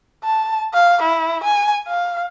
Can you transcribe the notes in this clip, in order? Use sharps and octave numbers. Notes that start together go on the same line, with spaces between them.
A5
F5
E4
G#5
F5